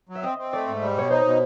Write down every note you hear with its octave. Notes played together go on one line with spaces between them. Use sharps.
F#3
E5
C4 D#5
C4
A3 D5
G#2
G3
B2 C#5
D#4 C5
B2